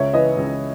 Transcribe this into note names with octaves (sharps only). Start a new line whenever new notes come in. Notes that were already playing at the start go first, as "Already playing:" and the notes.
Already playing: C#2 C#5 E5
E3 B4 D#5
C#2